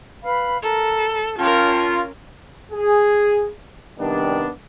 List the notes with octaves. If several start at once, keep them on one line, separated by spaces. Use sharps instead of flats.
B4 F5 B5
A4 A#4
C#4 F4 A#4 G5 A5
G#4
C3 D#3 G3 B3 D4